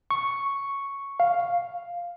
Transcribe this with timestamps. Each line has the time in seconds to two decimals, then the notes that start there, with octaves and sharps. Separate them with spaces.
0.11 C#6
1.20 F5